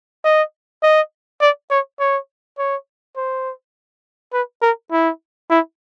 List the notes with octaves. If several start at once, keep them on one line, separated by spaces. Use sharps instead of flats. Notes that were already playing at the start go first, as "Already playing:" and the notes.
D#5
D#5
D5
C#5
C#5
C#5
C5
B4
A#4
E4
E4